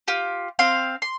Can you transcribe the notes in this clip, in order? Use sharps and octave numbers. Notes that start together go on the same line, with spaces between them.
F4 G4
C4 F5 C6
C6